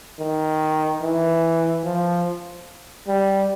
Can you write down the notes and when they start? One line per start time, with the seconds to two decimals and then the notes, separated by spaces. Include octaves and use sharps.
0.19 D#3
1.02 E3
1.84 F3
3.08 G3